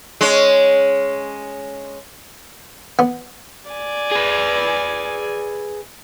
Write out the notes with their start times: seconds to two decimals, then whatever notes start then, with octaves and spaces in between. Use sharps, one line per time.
0.21 G#3 C#4
2.99 B3
3.70 D5 G#5
4.11 G#4 B4